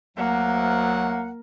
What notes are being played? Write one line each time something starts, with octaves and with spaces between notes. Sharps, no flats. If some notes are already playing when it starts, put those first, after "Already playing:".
D2 F#3 A#3 F#5